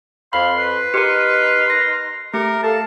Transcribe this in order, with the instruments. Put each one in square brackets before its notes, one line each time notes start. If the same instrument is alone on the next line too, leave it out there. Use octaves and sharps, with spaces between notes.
[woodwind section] F2 C6 [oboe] F5 [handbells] B5
[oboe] B4
[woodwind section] D#4 C6 F6 [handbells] G4 A#4
[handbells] A#6
[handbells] A3 G4 [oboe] A#4
[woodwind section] A4 F5 [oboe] A5